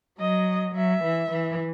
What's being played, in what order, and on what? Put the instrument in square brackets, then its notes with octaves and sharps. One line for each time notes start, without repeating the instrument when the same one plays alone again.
[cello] F#3 [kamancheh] D#5
[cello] F#3 [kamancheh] E5
[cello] E3
E3